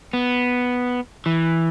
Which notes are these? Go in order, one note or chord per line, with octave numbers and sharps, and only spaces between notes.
B3
E3